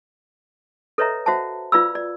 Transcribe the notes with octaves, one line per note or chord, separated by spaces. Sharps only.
A4 B4 C#5 D#5 E5 A#5
F#4 C5 E5 F#5 A5
F4 B4 D5 F5 B5 E6
D5